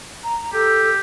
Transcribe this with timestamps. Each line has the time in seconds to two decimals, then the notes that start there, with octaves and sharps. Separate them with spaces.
0.24 A#5
0.53 G4 A4